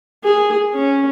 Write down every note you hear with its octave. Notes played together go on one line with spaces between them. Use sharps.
G#4
C#4